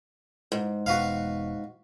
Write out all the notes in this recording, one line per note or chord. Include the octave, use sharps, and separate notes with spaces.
G#2
E1 B2 F#4 B4 F5